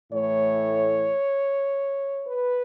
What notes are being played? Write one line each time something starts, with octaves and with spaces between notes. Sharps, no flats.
A2 E3 A3 C#5
B4